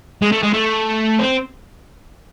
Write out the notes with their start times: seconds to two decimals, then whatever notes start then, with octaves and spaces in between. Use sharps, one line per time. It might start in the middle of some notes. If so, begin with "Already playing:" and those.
0.22 G#3
0.32 A3
0.43 G#3
0.54 A3
1.19 C4